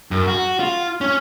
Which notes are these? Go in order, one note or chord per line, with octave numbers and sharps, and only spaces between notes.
F#2
F#4
F4
C#4